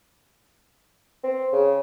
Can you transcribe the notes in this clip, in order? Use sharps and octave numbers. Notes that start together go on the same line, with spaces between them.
C4
C#3